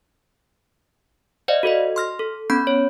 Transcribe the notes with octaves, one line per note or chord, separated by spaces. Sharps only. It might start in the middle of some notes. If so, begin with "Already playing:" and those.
C5 D5 D#5 F5
F#4 A4 C5 D#5
C6 F6 A#6
A4
B3 C#4 B5 G6
C#5